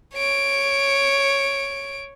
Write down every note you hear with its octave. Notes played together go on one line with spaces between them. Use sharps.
C#5 D7